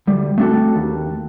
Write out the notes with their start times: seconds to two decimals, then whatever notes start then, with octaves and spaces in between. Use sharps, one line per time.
0.07 D2 G3
0.38 A3 C4 D4 F#4 A4
0.75 D#2